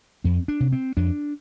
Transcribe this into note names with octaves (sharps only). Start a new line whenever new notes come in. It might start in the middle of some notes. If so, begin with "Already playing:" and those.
F2 C4
D4
C3
C4
F2 D4